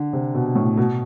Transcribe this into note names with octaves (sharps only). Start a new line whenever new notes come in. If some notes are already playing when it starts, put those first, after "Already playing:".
Already playing: D3
C3
B2
A2
B2